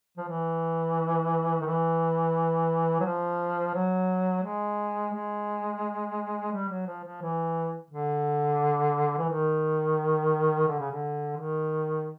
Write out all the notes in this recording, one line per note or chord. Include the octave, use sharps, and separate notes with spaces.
F3
E3
D#3
E3
F#3
F3
F#3
G#3
G#3
G3
F#3
F3
F3
E3
D3
E3
D#3
D3
C#3
D3
D#3